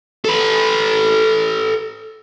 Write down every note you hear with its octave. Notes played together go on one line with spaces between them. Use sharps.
A4 B4